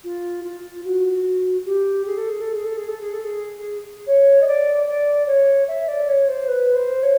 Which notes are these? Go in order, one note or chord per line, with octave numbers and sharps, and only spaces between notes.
F4
F4
F#4
G4
G#4
A4
G#4
A4
G#4
A4
G#4
A4
G#4
A4
G#4
C#5
D#5
D5
D5
C#5
E5
D5
C#5
C5
B4
C5
C#5